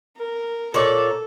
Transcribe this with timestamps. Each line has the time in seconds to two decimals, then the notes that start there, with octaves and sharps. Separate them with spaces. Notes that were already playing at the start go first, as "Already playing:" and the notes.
0.17 A#4
0.74 A#2 A4 C#5 D5